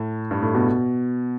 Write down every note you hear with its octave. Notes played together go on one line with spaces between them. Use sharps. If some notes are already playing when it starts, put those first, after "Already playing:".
Already playing: A2
G2
A2
B2